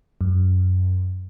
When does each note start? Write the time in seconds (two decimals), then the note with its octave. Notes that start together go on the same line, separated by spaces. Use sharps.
0.21 F#2